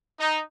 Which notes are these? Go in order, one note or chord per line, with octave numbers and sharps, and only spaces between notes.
D#4